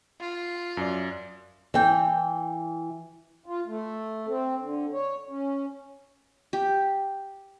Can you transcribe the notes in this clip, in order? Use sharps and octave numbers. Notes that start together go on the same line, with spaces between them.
F4
F#2 D5
E3 G5
F4
A3
C4
D3
C#5
C#4
G4